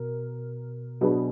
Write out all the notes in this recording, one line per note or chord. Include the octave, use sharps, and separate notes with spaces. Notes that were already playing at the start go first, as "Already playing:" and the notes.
Already playing: B2 A#4
B2 F#3 D4 G#4 B4